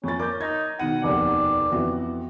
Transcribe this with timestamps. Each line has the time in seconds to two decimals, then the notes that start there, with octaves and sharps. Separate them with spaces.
0.04 F2 A#3 C#4 A6
0.20 A#4 D6 G6
0.41 D#4 G#6
0.79 B2 D#3 F#5 D#7
1.03 F1 D#2 D5
1.72 F2 E3 B3 F#4